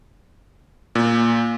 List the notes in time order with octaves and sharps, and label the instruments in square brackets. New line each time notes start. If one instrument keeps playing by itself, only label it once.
[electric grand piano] A#2